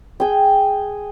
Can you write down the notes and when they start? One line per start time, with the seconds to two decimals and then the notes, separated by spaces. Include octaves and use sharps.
0.20 G#4 G5